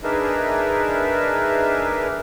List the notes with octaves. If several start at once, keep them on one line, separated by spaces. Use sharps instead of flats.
D4 D#4 G#4 A#4 B4 E5